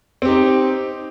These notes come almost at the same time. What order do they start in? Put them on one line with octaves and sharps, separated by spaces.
C4 G4 D#4